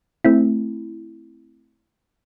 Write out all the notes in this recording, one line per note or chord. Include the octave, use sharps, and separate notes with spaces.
A3 C4 E4